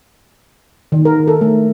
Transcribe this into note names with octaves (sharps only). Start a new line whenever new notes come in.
D#3
A#4
A4
A3